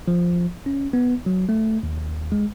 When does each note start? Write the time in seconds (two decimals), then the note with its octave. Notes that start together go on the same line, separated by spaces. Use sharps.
0.08 F3
0.66 C#4
0.93 B3
1.26 F#3
1.49 A3
1.83 D#2
2.32 G#3